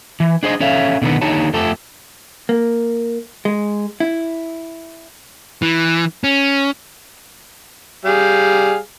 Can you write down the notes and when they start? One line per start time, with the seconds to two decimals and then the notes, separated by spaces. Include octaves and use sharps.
0.20 E3
0.43 D4 G#4 C5 D#5
0.60 C#4 A4 C#5 E5 F5
1.02 B2 D3 D#3 B3
1.21 D#2 D3 D#4 G4 C#5 A5
1.53 F2 F3 A3 G4 A4
2.49 A#3
3.45 G#3
4.00 E4
5.62 E3
6.24 C#4
8.05 G3 G#4 F5